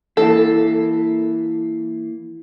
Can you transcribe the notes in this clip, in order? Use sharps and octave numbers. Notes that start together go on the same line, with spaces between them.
E3 A#3 E4 A4